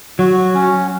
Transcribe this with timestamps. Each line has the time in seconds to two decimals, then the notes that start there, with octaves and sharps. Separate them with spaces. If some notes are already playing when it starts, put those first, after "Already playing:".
0.19 F#3 F#4
0.55 C#4